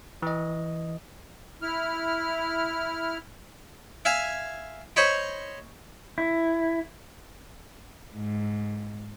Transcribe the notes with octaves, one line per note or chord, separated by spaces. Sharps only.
E3 D#5
E4 F6
E5 F5 G#5
C5 C#5 D#5 B5
E4
G#2